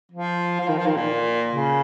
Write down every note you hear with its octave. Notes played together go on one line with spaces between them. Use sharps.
F3
F3
D#3
F3
D#3
A#2
C#3